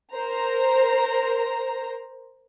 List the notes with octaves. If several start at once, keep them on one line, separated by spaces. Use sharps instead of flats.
A#4 C5 A#5